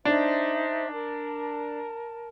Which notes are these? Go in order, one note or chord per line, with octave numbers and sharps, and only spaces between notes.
D4 D#4 C5 E5
A#4 A5